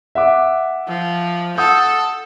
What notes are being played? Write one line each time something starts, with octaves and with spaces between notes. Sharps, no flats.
E5 F#5 D6
F3
A4 F#5 D#6 G6